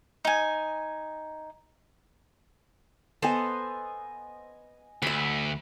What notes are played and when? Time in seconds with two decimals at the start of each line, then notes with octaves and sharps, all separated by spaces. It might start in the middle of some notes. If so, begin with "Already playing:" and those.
0.25 D#4 G#5
3.22 B3 A4 C5 D#5 G#5
5.02 D2 E5 B5